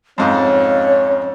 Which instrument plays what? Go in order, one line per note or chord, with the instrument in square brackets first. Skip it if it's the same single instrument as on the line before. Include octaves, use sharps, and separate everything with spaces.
[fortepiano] F2 G#2 [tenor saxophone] C#4 [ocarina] C#5 [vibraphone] D#5 F5